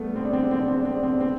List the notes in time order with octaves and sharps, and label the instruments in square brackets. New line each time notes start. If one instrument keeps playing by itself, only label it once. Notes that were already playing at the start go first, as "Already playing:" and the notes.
Already playing: [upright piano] G3 A3 B3
C4
D4
C4
D4
C4
D4
C4
D4
C4
D4
C4
D4
C4